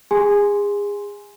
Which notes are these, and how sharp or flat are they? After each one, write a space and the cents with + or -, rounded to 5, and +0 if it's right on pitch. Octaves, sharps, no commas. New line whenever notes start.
G#4 -30 G#5 +0 C6 +0